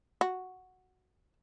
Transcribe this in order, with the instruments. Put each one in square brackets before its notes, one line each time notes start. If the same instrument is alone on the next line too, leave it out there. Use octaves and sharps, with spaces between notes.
[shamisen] F#4